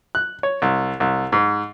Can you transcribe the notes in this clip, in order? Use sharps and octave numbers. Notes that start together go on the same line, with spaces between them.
F#6
C#5
C2
C2
G#2